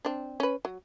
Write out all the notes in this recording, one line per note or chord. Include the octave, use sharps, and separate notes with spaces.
C4 D4
C#4 B4
F#3